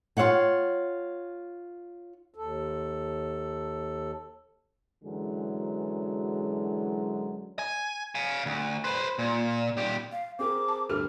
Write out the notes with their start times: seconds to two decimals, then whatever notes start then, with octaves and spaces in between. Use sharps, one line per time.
0.17 F4 A4 C#5 F#5 G5
2.34 D#2 A4
5.04 F#2 D3 E3 F#3 G#3
7.59 G#5
8.15 F5 G#5
8.46 D2
8.84 B4 C5
9.19 A#2
9.77 A#2 G4
10.12 F5
10.39 C4 G#4 A#4 D6
10.68 A5
10.90 D2 G2 G4 A4 A#4 F6